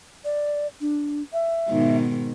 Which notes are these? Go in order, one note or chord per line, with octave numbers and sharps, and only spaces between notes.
D5
D4
E5
G#2 B2 D#3